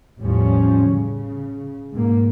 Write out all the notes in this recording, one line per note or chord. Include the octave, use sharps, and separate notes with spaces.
A1 E2 F3 G3 C#4
C#3
G#2 B2 A#3